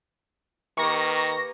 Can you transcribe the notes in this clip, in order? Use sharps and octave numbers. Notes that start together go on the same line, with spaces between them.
D#3 A#3 G4 B4 C#6 A#6